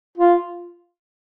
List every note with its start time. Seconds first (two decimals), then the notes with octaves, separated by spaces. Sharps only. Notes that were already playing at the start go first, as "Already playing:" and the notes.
0.18 F4